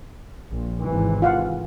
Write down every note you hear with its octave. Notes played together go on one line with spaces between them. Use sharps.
A#1
G#1 C3 E3
F4 F5 F#5